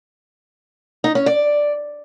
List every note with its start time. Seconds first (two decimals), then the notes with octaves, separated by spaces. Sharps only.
1.04 D#4
1.15 C#4
1.26 D5